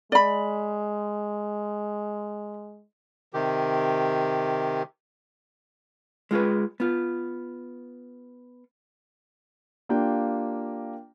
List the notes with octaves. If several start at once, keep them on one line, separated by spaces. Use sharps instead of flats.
G#3 D5 B5
C3 D#3 G4
G#3 F4 G#4 B4
B3 F4
A#3 D4 F4 G4 G5